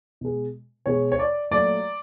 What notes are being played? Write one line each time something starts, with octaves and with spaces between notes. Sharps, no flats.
B2 G#3
B2 G#3 C#5
C#5
D5
A#2 F#3 A3 D5